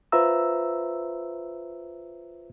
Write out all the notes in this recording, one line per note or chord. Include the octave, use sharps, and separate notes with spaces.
F4 B4 C5 E5 A#5 E6